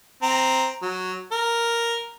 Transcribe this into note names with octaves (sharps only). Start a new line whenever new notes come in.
C4 A#5
F#3
A#4